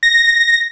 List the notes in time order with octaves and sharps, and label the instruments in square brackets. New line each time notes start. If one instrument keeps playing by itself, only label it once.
[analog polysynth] A#6